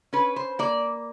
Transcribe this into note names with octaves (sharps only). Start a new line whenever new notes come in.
C#4 B4
C5
A#3 D5